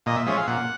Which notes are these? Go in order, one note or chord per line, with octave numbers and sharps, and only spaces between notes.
A#2 D#5
E5
F3 G#3 C#4 E5
F5
A#2 F#5